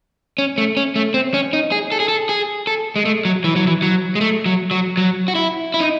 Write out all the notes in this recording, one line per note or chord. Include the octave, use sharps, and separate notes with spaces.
C#4
A3
C#4
A3
C4
C#4
D#4
G#4
A4
G#4
A4
G#4
A4
G#3
A3
F#3
E3
F#3
E3
F#3
G#3
A3
F#3
F#3
F#3
F#4
E4
E4
D#4